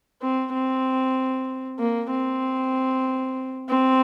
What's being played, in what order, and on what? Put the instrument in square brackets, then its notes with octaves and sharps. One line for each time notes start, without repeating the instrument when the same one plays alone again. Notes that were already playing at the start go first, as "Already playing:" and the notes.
[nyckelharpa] C4
C4
A#3
C4
C4